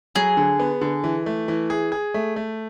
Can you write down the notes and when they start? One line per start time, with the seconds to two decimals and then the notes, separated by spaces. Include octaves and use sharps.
0.16 F#3 G#4
0.37 D3
0.59 B3
0.81 D3
1.04 E3
1.26 A3
1.48 E3
1.70 G#4
1.92 G#4
2.14 A3
2.36 A3